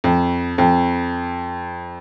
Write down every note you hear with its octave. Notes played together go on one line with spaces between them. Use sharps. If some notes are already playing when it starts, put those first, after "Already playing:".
F2
F2